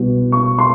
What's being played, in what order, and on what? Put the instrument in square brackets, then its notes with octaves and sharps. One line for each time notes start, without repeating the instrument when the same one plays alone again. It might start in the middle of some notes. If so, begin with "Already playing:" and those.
Already playing: [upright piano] C2 B2
C#6
C6